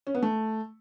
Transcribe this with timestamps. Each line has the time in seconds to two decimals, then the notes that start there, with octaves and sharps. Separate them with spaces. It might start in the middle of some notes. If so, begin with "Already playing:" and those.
0.07 C#4
0.15 B3
0.22 A3